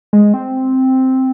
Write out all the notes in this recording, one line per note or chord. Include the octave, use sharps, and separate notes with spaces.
G#3
C4